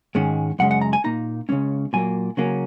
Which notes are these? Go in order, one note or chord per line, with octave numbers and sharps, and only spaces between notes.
G#2 D#3 G#3 C#4
F#2 C#3 G#3 C#4 F#5
F#5
A#5
G#5
A#2 A#3 D#4 A#5
C#2 C#3 A#3 C#4
A#2 F#3 A#3 G#5
C#3 F#3 A#3 C#4